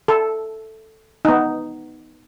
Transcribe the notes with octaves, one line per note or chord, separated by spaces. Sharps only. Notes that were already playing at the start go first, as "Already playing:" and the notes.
A4
B3 D#4